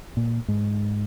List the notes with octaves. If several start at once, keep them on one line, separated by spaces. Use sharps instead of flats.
A#2
G#2